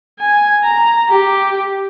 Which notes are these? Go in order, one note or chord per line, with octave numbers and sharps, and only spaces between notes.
G#5
A#5
G4